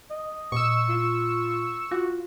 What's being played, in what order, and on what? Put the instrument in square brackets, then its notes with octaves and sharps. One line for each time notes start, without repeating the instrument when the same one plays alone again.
[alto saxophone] D#5
[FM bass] A#2 [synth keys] C#6 E6
[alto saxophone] F4
[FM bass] F4 [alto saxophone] F#4